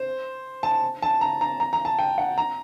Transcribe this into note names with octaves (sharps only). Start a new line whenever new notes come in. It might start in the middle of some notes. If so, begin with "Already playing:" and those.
Already playing: C5
A5
A5
A#5
A#5
A#5
A#5
A5
G5
F#5
A#5